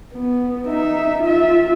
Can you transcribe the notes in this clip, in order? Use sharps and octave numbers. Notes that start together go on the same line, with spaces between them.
B3
D#4 E5
F4 E5